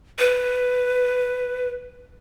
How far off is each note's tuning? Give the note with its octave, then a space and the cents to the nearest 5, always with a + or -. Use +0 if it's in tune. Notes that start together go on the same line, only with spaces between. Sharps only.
B4 +10